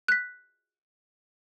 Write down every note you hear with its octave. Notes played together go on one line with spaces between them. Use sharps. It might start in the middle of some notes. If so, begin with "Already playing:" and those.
F#6 B6